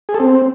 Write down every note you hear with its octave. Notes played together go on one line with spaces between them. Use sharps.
G#4
A4
C4